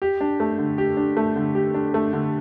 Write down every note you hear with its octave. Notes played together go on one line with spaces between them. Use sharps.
G4
D4
A3
D3
G4
D4
A3
D3
G4
D4
A3
D3